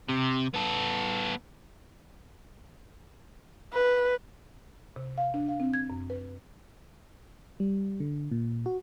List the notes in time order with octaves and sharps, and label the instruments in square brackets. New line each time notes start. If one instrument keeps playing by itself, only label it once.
[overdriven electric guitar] C3
B3 A4
[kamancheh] B4
[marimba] C3
F5
D4
F5
C4
G#6
F#2
B4
[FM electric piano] G3
D3
A#2
F#4